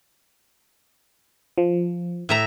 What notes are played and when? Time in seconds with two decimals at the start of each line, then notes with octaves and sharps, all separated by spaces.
1.58 F3
2.29 A2 E5 A#5